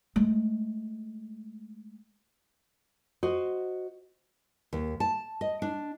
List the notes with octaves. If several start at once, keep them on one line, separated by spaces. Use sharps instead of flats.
G#3 A3
F#4 C5 D#5
D#2
A5
D#5
D4